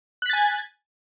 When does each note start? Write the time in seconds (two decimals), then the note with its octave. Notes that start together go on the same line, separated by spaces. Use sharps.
0.22 F#6
0.26 B6
0.30 A6
0.33 G#5
0.37 G#6